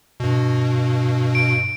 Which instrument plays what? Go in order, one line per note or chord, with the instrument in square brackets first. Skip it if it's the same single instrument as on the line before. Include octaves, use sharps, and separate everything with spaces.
[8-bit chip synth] G2 B2
[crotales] D7